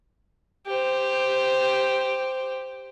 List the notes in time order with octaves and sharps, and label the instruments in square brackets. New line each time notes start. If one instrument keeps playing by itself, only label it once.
[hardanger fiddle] G4 C5